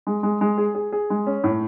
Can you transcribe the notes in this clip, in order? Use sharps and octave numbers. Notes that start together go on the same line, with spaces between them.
G#3
G#3
G#3
G#4
G#4
G#4
G#3
C#4
A2